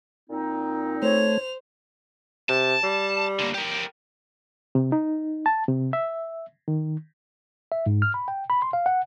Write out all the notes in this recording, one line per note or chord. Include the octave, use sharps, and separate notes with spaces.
A#2 C4 D#4
A3 C5 C#5 F7
C3 A5
G3
D3 A#3
G4 A#4
C3
D#4
A5
C3
E5
D#3
E5
G#2
F6
B5
G5
B5
C6
F5
F#5